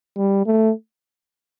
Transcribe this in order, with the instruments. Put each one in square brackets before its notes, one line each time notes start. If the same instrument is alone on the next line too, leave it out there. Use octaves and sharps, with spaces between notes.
[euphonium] G3
A3